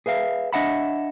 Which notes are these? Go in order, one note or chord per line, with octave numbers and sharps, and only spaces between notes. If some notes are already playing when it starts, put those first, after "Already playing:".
G#4 B4 E5 F5
D4 D#5 E5 F#5 A5 B5